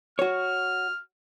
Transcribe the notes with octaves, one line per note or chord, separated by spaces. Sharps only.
F#4 C#5 F6